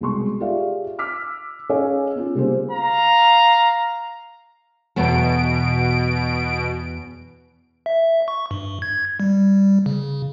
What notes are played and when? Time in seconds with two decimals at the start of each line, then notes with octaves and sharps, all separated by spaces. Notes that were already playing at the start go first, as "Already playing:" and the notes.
0.01 C2 B2 G#3 C6 C#6
0.40 F4 G4 G#4 D5 E5 F5
0.99 D6 E6 F6 B6
1.69 C#4 G#4 C#5 D#5 F5 G#5
2.16 B3 C#4 F4
2.35 C#3 G3 A#3 B3 G#4 C5
2.71 F5 A#5
4.96 E2 B2 B3 A4 D7
7.86 E5
8.28 C#6
8.51 G2
8.82 G#6
9.20 G3
9.86 C#3